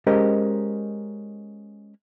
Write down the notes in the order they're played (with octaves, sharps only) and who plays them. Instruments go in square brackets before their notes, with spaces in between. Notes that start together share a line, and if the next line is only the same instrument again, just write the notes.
[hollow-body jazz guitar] G#3 C#4 G4 A#4 C5 D#5